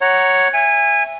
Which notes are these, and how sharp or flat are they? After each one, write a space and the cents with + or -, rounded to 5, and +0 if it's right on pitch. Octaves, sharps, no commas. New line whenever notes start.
C#5 +0 F#5 +10 A#5 +0
E5 +10 G#5 -20